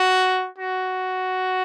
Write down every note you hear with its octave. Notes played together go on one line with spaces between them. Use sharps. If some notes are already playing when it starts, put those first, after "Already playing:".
Already playing: F#4
F#4